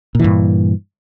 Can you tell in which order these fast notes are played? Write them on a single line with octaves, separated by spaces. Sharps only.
A#2 E3 G2